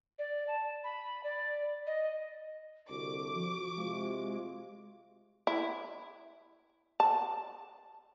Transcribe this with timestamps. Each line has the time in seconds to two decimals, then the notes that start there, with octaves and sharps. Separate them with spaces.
0.19 D5
0.48 A5
0.84 B5
1.24 D5
1.87 D#5
2.89 C2 D3 F#4 D6
3.35 F3
3.77 C3 G#3 F4
5.47 E4
7.00 A5